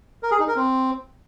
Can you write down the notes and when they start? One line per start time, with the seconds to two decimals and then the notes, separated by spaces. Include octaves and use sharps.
0.23 A#4
0.31 G#4
0.40 D#4
0.48 A#4
0.56 C4